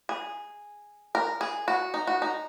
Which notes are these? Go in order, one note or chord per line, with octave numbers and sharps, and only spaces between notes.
G#4
A#4
G#4
F#4
D#4
F#4
D#4